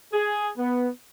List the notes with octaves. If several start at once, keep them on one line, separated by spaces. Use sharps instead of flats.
G#4
B3